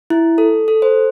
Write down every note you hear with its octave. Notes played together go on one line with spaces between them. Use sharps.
E4
A4
A4
C5